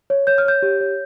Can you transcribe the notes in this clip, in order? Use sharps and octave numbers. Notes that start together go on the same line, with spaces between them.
C#5
C#5 G6
F6
C#5 G6
G4
C#5